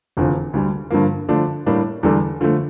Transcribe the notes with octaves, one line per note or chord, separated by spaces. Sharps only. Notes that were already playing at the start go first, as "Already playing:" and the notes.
F1 E2 D3 F3
D2 D3 G3
G2 D3 F3 A#3
D3 F3 A3 D4
A2 G3 A#3 D4
E2 D3 G3 D4 A4
D3 F3 A3